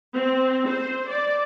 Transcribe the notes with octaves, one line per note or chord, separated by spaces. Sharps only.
C4
C5
D5